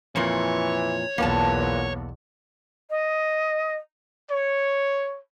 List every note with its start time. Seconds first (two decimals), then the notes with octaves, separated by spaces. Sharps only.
0.16 F2 A#2 E3 C#5
1.18 B1 E2 A#2 A#3 B3 A5
2.90 D#5
4.30 C#5